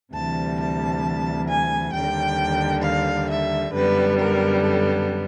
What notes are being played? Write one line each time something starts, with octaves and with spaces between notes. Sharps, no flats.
D2 C3 E3 G3 A5
A5
G#5
D#2 D3 G3 G5
F5
E5
F#2 D3 G3 B3 B4
A#4
A4